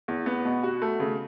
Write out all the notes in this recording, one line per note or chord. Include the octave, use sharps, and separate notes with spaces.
E2
B3
B2
F#4
A3
C#3